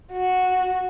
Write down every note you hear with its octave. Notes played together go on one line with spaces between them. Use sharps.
F#4